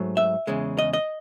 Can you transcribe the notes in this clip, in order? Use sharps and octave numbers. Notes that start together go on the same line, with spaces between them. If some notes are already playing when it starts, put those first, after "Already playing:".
Already playing: G#2 F#3 A3
E5
E2 C#3 G#3
D#5
D#5